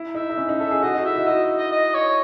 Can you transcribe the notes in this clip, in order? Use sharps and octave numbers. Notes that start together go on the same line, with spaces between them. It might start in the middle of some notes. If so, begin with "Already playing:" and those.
Already playing: E4
D#4 E5
D#4
C#4
D#4
A4 E5
G#4
F#4 D#5
D#4
E4 E5
F#4
D#4 D#5
D#5
D#5
C#5